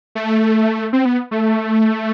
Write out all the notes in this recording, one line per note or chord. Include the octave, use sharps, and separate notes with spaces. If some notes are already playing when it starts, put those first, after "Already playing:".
A3
C4
B3
A3